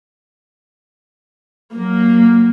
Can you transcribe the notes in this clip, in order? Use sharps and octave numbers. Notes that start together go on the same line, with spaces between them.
F#3 A#3